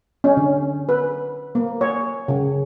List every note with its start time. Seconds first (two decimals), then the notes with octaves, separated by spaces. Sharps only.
0.24 C#4
0.37 D3
0.89 B4
1.55 A#3
1.81 C#5
2.28 C#3